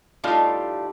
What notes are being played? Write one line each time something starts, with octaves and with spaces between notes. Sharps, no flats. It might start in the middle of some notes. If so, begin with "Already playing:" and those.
A2 G3 A3 D#4 F4 F5